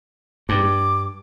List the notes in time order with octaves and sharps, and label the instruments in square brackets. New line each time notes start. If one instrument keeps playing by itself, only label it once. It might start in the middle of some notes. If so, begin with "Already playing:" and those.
[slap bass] G2 [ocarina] D6